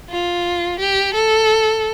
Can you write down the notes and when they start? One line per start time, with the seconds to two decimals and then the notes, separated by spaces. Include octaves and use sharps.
0.10 F4
0.80 G4
1.14 A4